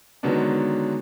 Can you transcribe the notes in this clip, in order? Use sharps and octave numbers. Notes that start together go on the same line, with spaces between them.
D3 D#3 F#3 G#3 B3 D4